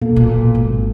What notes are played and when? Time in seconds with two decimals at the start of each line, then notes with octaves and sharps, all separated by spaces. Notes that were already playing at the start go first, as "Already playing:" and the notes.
0.02 B2 A#3 B3 A4
0.16 A#2
0.55 G#1